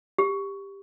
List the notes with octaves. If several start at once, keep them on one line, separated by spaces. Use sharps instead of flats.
G4